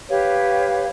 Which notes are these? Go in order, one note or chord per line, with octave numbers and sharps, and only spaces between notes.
G4 B4 C#5 F5